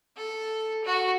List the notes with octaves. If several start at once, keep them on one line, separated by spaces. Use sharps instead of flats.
A4
F#4